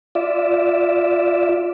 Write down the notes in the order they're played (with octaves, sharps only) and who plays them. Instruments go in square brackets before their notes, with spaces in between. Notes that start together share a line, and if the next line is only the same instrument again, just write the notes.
[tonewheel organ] F4 D5 E5